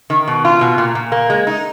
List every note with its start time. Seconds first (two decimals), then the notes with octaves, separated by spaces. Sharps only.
0.10 D#3
0.28 B2
0.45 F4
0.61 B2
0.78 A#2
0.95 A#2
1.12 A#3
1.30 G#3
1.47 D#4